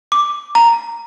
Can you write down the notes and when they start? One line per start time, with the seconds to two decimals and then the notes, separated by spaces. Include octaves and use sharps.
0.12 D6
0.55 A#5